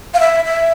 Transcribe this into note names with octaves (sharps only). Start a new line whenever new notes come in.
F5
E5
E5